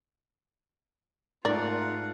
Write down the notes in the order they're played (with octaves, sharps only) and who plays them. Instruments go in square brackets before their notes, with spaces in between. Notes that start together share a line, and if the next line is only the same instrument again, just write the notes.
[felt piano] G#2 A3 [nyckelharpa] F4 F#5 [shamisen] A#4 D5